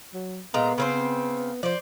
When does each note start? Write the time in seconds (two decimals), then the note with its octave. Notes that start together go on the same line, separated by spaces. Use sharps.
0.14 F#3
0.54 A#2 G#3 B3 A#5
0.78 C#3 C4 C5
1.63 F3 C5 D5